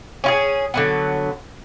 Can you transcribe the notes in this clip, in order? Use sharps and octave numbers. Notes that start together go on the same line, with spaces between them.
C#4 F4 G#4
D3 F#3 B3